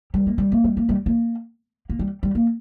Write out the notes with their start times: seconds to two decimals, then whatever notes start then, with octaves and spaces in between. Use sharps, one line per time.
0.14 G3
0.26 A#3
0.38 G3
0.52 A#3
0.64 G3
0.77 A#3
0.89 G3
1.06 A#3
1.89 A#3
1.99 G3
2.23 G3
2.35 A#3